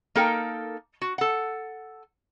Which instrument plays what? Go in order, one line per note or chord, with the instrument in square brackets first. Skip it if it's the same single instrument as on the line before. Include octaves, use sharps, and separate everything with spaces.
[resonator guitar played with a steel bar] A#3 D#4 A4 A#4 G5
F#4
A4 F#5